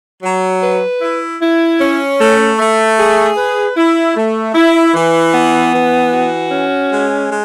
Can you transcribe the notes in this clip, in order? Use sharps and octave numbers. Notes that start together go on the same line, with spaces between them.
F#3
B4
E4
E4
C#4
A3
A3
G#4
B4
E4
A3
E4
E3
B3
E3
F#4
C#4
G#3
G#3